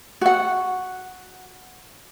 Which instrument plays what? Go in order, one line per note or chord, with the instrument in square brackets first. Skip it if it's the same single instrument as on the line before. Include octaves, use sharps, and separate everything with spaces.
[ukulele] F#4 F#5